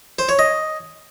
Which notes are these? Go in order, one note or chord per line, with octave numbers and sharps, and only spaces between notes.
C5
C#5
D#5